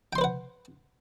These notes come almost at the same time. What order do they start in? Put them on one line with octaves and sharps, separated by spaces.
G5 C6 C5 B4 F#5